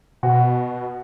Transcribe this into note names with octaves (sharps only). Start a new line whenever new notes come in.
B2 F#4